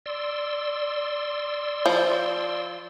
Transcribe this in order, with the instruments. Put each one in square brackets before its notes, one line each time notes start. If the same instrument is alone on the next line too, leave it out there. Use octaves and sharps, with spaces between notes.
[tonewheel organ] D5 C6 E6
[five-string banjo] F3